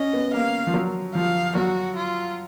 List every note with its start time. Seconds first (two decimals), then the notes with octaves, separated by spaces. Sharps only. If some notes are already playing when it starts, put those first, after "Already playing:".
Already playing: C#4 D#5
0.13 B3
0.33 A#3 F5
0.67 F3
0.74 F#3
1.14 F3 F5
1.55 F#3 F#4
1.96 F4